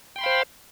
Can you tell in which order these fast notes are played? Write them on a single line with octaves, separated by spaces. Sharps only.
G5 C6 B5 F5 C5